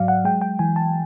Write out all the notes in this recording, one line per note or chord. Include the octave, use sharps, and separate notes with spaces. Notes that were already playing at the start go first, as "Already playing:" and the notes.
Already playing: G#2 F#3 D5 F5
F#5
G#3 G5
G5
E3 G#5
A5